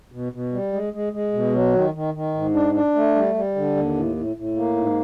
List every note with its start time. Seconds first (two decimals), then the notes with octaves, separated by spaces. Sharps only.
0.12 B2
0.32 B2
0.53 G3
0.73 G#3
0.93 G#3
1.13 G#3
1.33 B2
1.54 F#3
1.74 D#3
1.94 D#3
2.14 D#3
2.34 G#2
2.54 D4
2.74 D4
2.95 A3
3.15 G3
3.35 G3
3.56 D3
3.76 D#2
3.95 A2
4.16 A2
4.36 A2
4.56 A#3
4.76 G#2